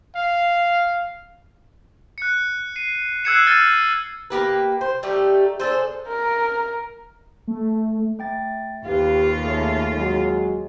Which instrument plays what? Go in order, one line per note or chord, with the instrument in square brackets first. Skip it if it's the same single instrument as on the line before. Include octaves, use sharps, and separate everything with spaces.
[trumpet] F5
[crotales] F#6 C#7
C7 D#7
E6 F#6 G#6 C7 C#7 E7
E6 F6 A6 D#7
[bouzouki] A#3 B3 G4 B4
C5
G3 A3 D#4 G4
D4 G#4 A4 C5
[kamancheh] A#4
[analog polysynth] A3
[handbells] A3 G5 A6
[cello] D#2 F4 [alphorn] G4 [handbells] B4 F5
[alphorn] A3 [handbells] G#4 C#5
[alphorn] F#3 [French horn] G#3